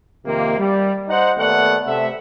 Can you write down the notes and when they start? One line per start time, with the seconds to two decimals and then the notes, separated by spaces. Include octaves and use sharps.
0.25 F2 C3 D#3 A#3
0.58 G3
1.09 D#4 C5 D#5 F#5
1.38 D#2 A3 B3 D5 F#5
1.86 C3 A3 E5